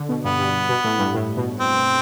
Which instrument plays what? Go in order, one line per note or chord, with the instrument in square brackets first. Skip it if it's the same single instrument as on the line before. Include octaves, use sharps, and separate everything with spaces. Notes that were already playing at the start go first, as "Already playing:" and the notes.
Already playing: [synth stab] D3
B2
[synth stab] G2 [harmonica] B3
[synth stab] G2
B2
A2
G2
A2
B2
[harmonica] C4